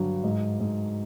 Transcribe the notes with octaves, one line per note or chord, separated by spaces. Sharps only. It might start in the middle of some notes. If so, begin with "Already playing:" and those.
Already playing: G2 D3 F#3
G#2
G#2